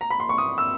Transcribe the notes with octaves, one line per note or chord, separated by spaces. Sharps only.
A#5
B5
C6
C#6
D#6
E6